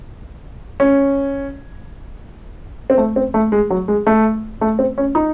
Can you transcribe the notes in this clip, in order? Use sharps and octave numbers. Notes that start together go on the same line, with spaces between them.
C#4
C4
A3
C4
A3
G#3
F#3
G#3
A3
A3
C4
C#4
D#4